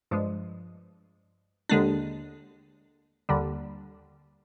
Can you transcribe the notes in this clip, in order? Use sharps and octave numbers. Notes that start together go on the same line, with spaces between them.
G2 F3 G#3
D#2 D3 G#3 D4
D#2 D3 G3